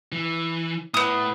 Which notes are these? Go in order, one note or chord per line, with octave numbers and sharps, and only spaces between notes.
E3
A2 B3 E4 D#6